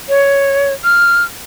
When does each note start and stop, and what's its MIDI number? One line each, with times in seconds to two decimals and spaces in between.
0.09 0.73 73
0.84 1.24 89